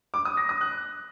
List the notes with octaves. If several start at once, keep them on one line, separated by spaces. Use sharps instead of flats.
D6
D#6
A#6
D#6
F#6